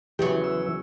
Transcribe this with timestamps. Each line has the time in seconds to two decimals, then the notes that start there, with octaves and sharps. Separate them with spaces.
0.19 E2 C#3 E3 F#3 G4
0.44 E6